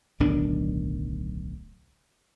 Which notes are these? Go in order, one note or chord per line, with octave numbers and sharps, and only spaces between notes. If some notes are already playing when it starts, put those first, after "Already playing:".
D1 B1 D#3 D4